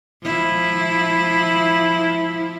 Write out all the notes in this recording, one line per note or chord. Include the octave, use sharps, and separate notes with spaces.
F3 E4